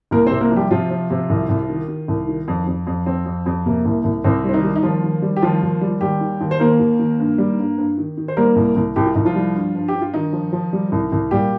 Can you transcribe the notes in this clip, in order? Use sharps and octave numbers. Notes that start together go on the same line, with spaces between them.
C2 A#3 A#4
C3 C4 C5
A#3 A#4
F3 G3 G4
C3 F3 F4
F3
C3
C2
C2
D#3
D#3
C2
D#3
F2
F2
F2
F2 C4
F2
F2
C3 A#3
C2
C2
C2 C4
G3
C4
D#3 D#4
G3
D#4
D#2 F3 F4
D#3
G3
G4
D#2 F3 F4
D#2
G3
D#2 G3 G4
D#3
D#2
C5
D#3 A#3 A#4
D#2
D#3
G2
G3
G2
G2
D#3
D#3
C5
G3 A#3 A#4
C2
C2
C2 G4
F4
C2 D#4
F3 F4
G3
G2
G2
G4
G2
F4
G2 D#3 D#4
F3
F3
G3
C2
C2
A#2 G3 G4